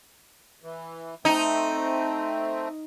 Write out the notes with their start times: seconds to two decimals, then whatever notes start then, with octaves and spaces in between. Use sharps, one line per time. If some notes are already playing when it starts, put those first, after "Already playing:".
0.63 E3
1.25 A3 C4 D#4